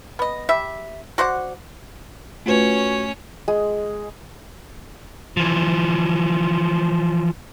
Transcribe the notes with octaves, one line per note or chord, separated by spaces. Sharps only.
B3 D#5
G3 E5
F#4 C5 D5 F#5
A3 C#4 F4 F#4 B4 C#5
G#3
E3 F3